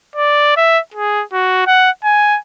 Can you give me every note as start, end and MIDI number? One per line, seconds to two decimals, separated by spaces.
0.16 0.55 74
0.57 0.79 76
0.94 1.23 68
1.33 1.63 66
1.67 1.90 78
2.04 2.38 80